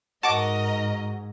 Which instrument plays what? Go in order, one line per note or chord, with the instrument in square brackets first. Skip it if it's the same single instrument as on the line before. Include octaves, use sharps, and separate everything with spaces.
[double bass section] G#2 [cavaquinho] F#4 [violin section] A#4 D#5 [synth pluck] A5 D6